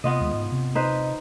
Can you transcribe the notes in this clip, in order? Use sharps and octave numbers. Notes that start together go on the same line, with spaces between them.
C3 B3 F4 D#5
D#2 G#3
G#2
C3
D#4 B4 C5